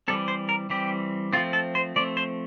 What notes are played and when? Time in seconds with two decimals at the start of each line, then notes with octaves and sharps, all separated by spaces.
0.08 E3 G3 C4 A4
0.28 C5
0.49 A#4
0.70 E3 G3 C4 G4
1.33 F3 A3 C4 F4
1.53 A4
1.75 C5
1.96 F3 A3 C4 D5
2.17 C5